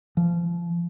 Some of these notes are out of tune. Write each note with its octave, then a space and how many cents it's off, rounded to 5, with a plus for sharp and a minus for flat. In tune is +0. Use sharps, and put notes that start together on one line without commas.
F3 -25